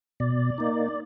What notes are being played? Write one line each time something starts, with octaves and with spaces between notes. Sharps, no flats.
B2 D5
A#3 D#4